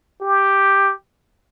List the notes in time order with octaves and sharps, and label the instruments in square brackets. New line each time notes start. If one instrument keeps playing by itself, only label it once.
[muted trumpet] G4